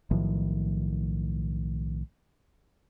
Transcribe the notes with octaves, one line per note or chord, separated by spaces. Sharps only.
B1 A2 D#3 F3